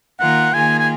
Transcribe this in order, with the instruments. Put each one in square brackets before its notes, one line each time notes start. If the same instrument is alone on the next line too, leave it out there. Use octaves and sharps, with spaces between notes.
[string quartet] D#3 A#3 F4 A#4 [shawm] F#5
[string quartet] D#3 A#3 F4 G#4 [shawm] G#5
[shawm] G#5